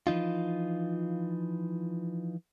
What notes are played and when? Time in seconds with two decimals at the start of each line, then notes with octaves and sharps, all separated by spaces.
0.07 E3 F3 D#4 F4